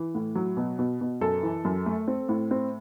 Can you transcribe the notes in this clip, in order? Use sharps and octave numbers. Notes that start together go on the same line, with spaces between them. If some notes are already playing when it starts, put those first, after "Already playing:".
Already playing: E3
A2
F#3
B2
B2
B2
F#2 A4
E3
F#2
A3
C4
A2
C4